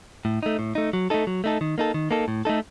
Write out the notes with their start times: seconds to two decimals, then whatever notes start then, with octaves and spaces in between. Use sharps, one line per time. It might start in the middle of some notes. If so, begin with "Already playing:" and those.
0.25 A2
0.43 A3 D#4
0.59 A2
0.75 A3 D#4
0.93 F#3
1.10 A3 D#4 A4
1.27 F#3
1.44 A3 D#4 A4
1.61 D#3
1.78 A#3 D#4 A4
1.94 D#3
2.11 A#3 D#4 A4
2.28 A2
2.45 A3 D#4 A4